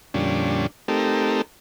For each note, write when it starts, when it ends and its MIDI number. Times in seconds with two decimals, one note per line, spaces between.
0.14 0.67 41
0.14 0.67 46
0.14 0.67 50
0.14 0.67 55
0.14 0.67 61
0.14 0.67 62
0.88 1.42 57
0.88 1.42 60
0.88 1.42 63
0.88 1.42 67
0.88 1.42 69
0.88 1.42 70